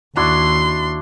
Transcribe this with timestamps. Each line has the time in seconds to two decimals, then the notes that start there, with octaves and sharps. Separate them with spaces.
0.17 D#2 D4 E4 F#4 C6